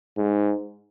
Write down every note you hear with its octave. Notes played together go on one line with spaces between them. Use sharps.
G#2